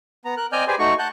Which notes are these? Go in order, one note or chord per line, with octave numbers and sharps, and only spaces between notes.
B3 A#5
A#4 F#6
C4 D5 D#5 G#5 F6 G6
G4 G#4 B4 C5 D5 G#5
A3 D#4 F#4 C#6
F#5 A5 F#6 G6